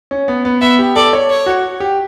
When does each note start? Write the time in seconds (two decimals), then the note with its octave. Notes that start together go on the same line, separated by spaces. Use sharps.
0.11 C#4
0.28 B3
0.45 B3
0.61 B3 E5
0.79 G4
0.96 A4 D5
1.13 C#5
1.30 C#5
1.46 F#4
1.80 G4